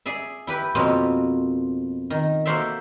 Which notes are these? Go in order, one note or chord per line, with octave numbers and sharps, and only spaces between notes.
G#4 D5 E5
E4 G4 B4
F2 B2 A#3 C4 C#5
D#3
A#3 F#4 A4 C5 D5 E5